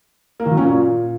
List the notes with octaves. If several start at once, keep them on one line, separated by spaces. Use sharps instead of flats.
A#3
D#3
F#3
C#4
A#2